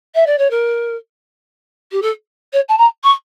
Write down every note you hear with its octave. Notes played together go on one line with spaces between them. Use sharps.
E5
D5
C#5
A#4
G4
A4
C#5
A5
A#5
C#6